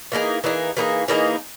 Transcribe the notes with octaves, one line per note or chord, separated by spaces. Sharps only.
E3 A#3 D#4 G#4
E3 A#3 D#4 G#4
E3 A#3 D#4 G#4
E3 A#3 D#4 G#4